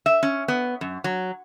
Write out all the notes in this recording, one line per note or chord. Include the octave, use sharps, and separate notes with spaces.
E5
C#4
B3
F#2
F#3